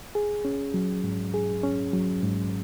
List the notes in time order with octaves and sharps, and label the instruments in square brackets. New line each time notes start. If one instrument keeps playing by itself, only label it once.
[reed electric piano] G#4
C#4
F#3
G#2
G#4
C#4
F#3
G#2